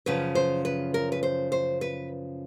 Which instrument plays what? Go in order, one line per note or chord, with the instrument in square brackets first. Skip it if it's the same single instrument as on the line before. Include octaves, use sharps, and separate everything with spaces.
[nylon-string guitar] F#2 C#3 F3 B4
C5
B4
A#4
B4
C5
C5
B4